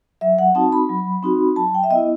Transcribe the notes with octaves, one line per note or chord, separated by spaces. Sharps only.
F#3 E5
F#5
C4 D#4 F#4 A5
B5
F#3
C4 D#4 F#4
F#3 A5
G5
E5
B3 E4 D#5